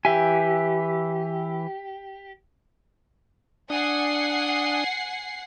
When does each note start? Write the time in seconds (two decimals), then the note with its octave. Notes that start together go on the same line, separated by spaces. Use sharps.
0.05 E3 G4 E5 G#5
3.70 D4 F#5 G#5 D#6 C7